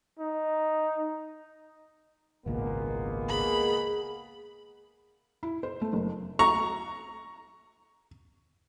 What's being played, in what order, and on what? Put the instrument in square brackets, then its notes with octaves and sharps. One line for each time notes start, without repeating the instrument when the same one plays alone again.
[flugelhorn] D#4
[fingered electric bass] G#1 C#2 A#2 [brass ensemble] G#3 A#3 B3
[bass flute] G#4 [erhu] B5
[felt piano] E4
C5
A3
F#1
[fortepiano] A#5 C#6